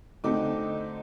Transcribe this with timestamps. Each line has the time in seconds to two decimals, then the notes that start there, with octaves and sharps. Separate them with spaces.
0.24 D3 A3 C4 D#4 D6